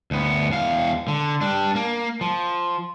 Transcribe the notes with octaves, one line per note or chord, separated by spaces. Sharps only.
D2 B3
E2 F5
D3
G3 D4
A#3
F3